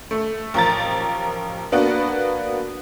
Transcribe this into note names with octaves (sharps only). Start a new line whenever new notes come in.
A3
A1 F3 A#4 A#5 A6
A#3 B3 D4 F#4